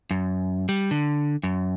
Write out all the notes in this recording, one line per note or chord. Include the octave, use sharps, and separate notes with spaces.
F#2
G3
D3
F#2